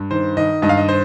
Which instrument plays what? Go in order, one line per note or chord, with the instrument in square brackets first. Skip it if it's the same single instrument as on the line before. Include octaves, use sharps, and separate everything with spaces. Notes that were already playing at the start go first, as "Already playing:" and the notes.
Already playing: [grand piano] G2
D#3 C5
D#3 D#5
G2 D#5
F5
D#5
C5